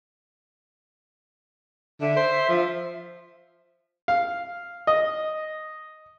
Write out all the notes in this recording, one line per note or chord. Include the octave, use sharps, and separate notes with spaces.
D3 E5
C5
F3
F5
D#5